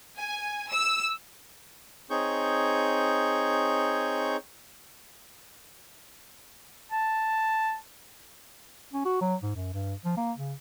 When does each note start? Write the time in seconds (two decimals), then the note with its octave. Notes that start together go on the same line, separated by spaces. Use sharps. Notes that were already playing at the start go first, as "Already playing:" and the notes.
0.19 G#5
0.71 E6
2.10 C4 D#4 G#4 C#5 C#6 G6
6.92 A5
8.93 C#4
9.05 F#4
9.21 F#3
9.43 G#2
9.55 F#2
9.74 G2
10.05 F3
10.17 A#3
10.38 C#3